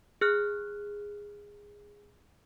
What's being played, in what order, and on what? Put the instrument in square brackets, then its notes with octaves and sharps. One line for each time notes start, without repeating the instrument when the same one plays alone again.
[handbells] G#4 F6 F#6